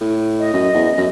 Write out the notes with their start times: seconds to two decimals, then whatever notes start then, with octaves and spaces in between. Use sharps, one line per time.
0.01 A2
0.39 D#5
0.54 F#2
0.74 E2
0.97 F#2